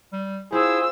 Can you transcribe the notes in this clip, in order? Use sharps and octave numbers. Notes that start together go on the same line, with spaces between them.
G3
C4 E4 F4 G#4 E6